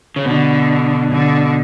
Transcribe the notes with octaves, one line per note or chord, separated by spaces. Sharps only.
C#3
B2 D3
D3